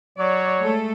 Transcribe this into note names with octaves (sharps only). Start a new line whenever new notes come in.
F#3 C#5 D5
G#3 A3 A4